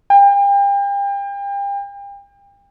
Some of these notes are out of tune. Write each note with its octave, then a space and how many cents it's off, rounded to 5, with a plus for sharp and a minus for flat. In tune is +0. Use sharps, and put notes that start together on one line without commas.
G5 +35